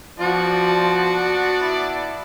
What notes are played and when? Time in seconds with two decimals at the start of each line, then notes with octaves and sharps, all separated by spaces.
0.20 F3 B3 D4 F#4 D5
1.61 E4